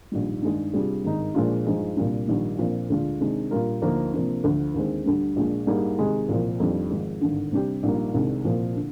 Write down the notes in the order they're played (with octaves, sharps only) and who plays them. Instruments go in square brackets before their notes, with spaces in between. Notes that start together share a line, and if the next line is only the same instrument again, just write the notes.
[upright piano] A#1 G#2 D#3 G3
G2 D#3 G#3 D4 G#4
C3 G3 D4 F4 G#4
G#1 G2 D#3 G#3 D#4
A#2 F3 G#3 D4 F4
G2 F3 G#3 D#4
C2 A#2 G3 D4
A#1 G#2 D#3 G3
A#1 A#2 F3 C4
D2 D3 G#3 D4 F4
C3 D#3 G#3 D4
A#2 G3 D4 F4 A#4
D2 D3 F3 A#3 D#4
C3 F3 A#3 D4
D2 D3 F3
D#2 D3 G#3 C4
D2 D3 G3 D4
A#1 A#2 G#3 D4
G#2 G3 A#3 D4 G#4
C3 D#3 G#3 D#4 G4
C2 A#2 F3
F2 D#3 G3 D4
G#1 G#2 F3 G#3
G#1 G2 D3
C3 G3 D4 G4
A#1 G#2 G3 A#3
C2 C3 D#3 G#3 D4
C2 A#2 F3
D3